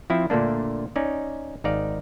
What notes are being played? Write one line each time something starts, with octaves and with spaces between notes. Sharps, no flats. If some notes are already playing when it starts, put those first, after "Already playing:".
F3 C4 E4
A#2 D3 A3 A#3 D4
C#4 D#4 D5
G#1 D#4 D5 F5